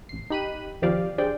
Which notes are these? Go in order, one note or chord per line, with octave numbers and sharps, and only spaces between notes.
A1 C7
D#4 G4 B5 F#6 D#7
D#2 F3 C4 G4 D5 F5
D4 G4 G#4 C5 D5 G5